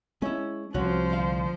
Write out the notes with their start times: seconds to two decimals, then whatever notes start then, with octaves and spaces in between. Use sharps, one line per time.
0.22 G#3 C#4 E4
0.74 C2 F3 C#4 F#4 C5
1.10 D2 F5